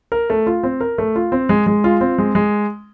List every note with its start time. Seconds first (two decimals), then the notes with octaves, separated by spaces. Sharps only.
0.12 A#4
0.30 A3
0.47 F4
0.63 C4
0.81 A#4
0.98 A3
1.16 F4
1.32 C4
1.49 G#3
1.67 G#3
1.84 F4
2.01 C4
2.18 G#3
2.35 G#3